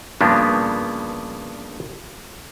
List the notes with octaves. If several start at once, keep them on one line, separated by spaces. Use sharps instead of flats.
G2 C#3 F3 A#3 B3 D4